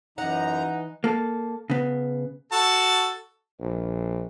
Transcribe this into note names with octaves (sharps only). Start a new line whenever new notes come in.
F#2 E3 D#4 F#5 A#5
A#3 A4
C#3 B3
F#4 A4 A5
A#1